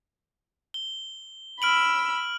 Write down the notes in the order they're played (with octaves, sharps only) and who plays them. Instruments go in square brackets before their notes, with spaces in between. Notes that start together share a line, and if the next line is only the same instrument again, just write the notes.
[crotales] G7
[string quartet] B5 E6 [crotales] F6 D7 F#7